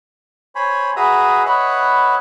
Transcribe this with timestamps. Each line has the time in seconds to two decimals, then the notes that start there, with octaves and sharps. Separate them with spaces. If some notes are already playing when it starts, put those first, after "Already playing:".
0.55 C5 C#5 G#5 B5
0.96 F#4 G#4 B4 E5 A#5 D#6
1.45 B4 C#5 D#5 E5 F#5 B5